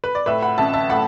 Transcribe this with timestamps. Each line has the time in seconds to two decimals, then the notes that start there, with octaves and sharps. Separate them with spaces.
0.04 B4
0.15 D5
0.26 A2 B4 E5
0.42 F#5 B5
0.58 A1 E5 A5
0.74 E5 A5
0.89 A2 F#5 B5